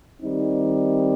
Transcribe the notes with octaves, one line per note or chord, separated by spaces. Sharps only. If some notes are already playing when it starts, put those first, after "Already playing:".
D#3 G3 C4 D#4